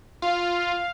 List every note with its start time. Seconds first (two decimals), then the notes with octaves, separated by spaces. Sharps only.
0.22 F4 F5